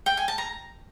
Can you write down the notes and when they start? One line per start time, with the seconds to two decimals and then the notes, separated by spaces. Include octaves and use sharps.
0.06 G5
0.17 G#5
0.28 A5
0.38 A#5